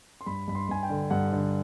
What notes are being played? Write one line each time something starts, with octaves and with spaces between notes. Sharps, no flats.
C6
G2 B5
G2 B5
C6
G2 G#5
G5
D3
G2 F#5
D3